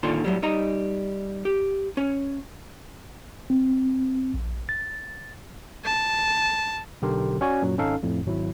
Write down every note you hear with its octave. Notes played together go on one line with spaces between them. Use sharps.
A#2 D3 D#3 F4 C6
A2 F#3 G3
G3 D#4 D#5 A#5
G4
C#4
C4
A#1
A6
A5
B1 D3 G4 A#4 C6
C#4 F#4 C#5 D5 G#5
F#2 A#2 F#3
G#1 C#4 D#4 A4 F5
F2 A2
G#1 F#3 E4